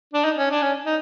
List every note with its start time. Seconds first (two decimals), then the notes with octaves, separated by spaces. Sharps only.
0.14 D4
0.24 D#4
0.38 C#4
0.51 D4
0.62 C#4
0.86 D#4